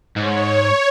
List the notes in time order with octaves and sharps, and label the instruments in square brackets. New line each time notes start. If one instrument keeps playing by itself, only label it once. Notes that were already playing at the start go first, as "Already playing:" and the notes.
[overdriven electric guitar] G#2 [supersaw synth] C#5